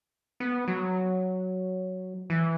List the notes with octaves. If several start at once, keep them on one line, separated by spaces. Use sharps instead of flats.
B3
F#3
E3